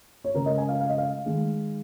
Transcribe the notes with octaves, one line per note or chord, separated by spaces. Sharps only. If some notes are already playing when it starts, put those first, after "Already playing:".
C#5
C#3 G#3 A#4
D#5
G#5
F5
F5
D#5
F5
D#3 G#3